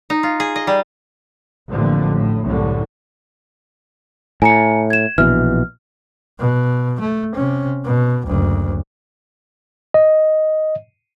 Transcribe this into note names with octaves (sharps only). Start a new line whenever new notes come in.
D#4
F4
G#4
D#5
G3
A1 F2 A#2 D3 F3
A2
C2 F#2 A2 D3
A2 G#5 A#5 C#7
G#6 E7
A#1 B2 E3 F6
B2
A3
C3 C#4
B2
F#1 D2
D#5